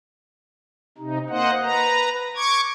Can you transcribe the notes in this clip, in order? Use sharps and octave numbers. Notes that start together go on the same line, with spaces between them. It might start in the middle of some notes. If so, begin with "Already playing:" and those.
C3 D#4
A#3 C5 D#5 F#5
B4 A#5
C#6 D6 G#6